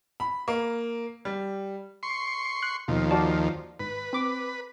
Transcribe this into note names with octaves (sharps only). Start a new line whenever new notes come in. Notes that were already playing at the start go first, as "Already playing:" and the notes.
B5
A#3
G3
C6 C#6
F#6
D#2 B2 F3
F#4 D5 A5
G#1 B4
C4 D6